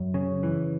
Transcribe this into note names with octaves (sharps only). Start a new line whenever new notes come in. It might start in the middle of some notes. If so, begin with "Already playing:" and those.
Already playing: F#2
C#3
E3